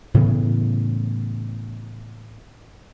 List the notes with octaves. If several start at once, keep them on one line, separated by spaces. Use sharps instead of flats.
A2 C#3 E3 B3